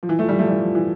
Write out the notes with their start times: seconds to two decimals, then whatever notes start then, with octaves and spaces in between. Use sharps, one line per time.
0.03 F3
0.09 E3
0.19 F3 A3
0.29 E3 G3
0.39 F3 A3
0.48 E3 G3
0.61 F3
0.75 E3